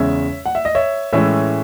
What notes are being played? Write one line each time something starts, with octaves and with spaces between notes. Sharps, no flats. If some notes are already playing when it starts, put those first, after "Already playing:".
Already playing: E2 C#3 G#3 C#4 C#5 E5
F#5
E5
D#5
C#5 E5
A2 E3 G#3 C#4 E4 C#5 E5